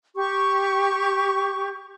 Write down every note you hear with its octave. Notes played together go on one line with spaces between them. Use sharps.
G4 C#6